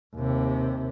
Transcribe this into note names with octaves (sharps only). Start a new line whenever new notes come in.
D#2 C3